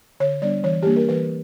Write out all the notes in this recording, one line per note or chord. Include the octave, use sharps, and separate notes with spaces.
D3 C#5
G3 B3 D4 D5
E3 C#5
G3 A#3 D4 G4
A#4
E3 B4